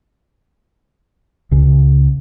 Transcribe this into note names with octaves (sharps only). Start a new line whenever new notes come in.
C#2 C#3